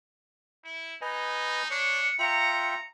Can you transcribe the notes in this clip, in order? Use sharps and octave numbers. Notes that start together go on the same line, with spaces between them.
E4
D#4 B4 D#5 G#5
D4 C#5 C#7
F4 E5 G5 A#5